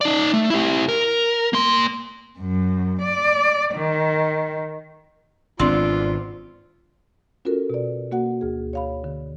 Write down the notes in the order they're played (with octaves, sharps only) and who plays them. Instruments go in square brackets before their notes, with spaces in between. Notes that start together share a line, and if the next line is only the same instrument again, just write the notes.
[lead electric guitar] D#4 D5
A3
E4 G4
A#4
A#3 C6
[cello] F#2
D5
D#3
[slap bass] G#1 B2 D4 [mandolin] C4 [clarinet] F4 [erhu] D5
[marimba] C#4 F4 F#4 A4 A#4
B2 D5
A#3 F#4 F#5
D2 G#4
C#5 F5 B5
D3